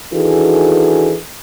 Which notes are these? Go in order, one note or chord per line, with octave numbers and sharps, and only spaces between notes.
D#3 E3 D4 F#4 G#4 A4